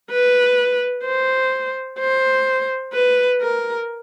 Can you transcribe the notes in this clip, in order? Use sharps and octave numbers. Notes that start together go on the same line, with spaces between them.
B4
C5
C5
B4
A#4